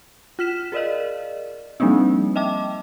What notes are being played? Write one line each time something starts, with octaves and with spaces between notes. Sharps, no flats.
F4 F6 B6 E7
G#4 A#4 D5 D#5 F5
F3 G3 A#3 C4 D4 D#4
D#5 E5 G5 A5 D6